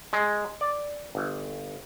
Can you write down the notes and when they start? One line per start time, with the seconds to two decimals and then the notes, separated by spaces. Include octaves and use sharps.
0.13 G#3
0.61 D5
1.15 G1